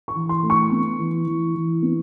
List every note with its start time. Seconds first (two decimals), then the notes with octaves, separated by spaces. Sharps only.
0.08 C#6
0.15 E3
0.29 C6
0.43 A3
0.50 C#6
0.71 B3
0.99 E3
1.27 E3
1.55 E3
1.82 B3